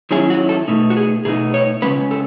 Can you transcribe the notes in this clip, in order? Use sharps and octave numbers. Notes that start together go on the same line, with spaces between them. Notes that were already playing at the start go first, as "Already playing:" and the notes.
D#3 F#3 C#4 E4 G#4
F#4
A4
B2 A3 D#4
F#4
G#4
B2 A3 D#4 G#4
C#5
C#3 G#3 C#4 B4
A4